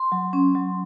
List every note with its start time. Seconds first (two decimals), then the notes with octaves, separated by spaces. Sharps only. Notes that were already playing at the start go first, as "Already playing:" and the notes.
Already playing: C6
0.12 F#3
0.33 C#4
0.55 F#3